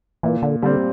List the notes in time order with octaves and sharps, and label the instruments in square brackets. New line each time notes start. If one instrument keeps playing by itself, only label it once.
[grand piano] A#2 [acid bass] E3
[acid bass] D3
[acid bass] D3 [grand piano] G3 C4